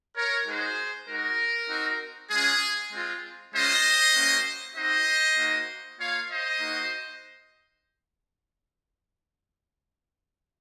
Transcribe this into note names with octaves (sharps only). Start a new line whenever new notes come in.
A#4 C#5
G#3 D#4 F#4 G#4 C5
G#3 D#4 F#4 A#4
C4 D#4 F#4
G#3 C#4 F4 G#4
G#3 C4 F4
G#3 C#4 F4 C5 D#5
A#3 C#4 F#4
C4 D#4 F#4 C5 D#5
A#3 D#4 F#4
A#3 F4 C#5 F5
C5 D#5
A#3 D#4 F#4